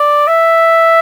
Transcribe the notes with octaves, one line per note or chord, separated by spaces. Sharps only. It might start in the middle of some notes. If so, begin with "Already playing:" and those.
Already playing: D5
E5